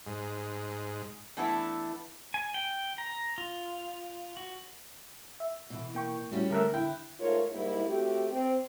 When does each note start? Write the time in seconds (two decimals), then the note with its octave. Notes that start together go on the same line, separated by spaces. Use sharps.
0.07 G#2
1.37 E3 A3 B3 D4 E4
2.34 G#5
2.54 G5
2.98 A#5
3.38 F4
4.37 F#4
5.40 E5
5.70 B2 E3
5.95 A#3 G5 C#6
6.31 D#2 G3 A3 C#4 E4 F#4
6.50 D3 A3 A#4 E5 F#6
6.74 E4 G5
7.19 G#2 A3 F4 A#4 C#5
7.52 G#2 G3 A#3 E4
7.86 A3 C4 F#4 G4
8.31 C4